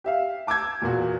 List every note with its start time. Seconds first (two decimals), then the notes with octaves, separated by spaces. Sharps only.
0.04 G4 E5 F5
0.47 A5 D6 E6 G6 G#6
0.82 E2 A#2 F#4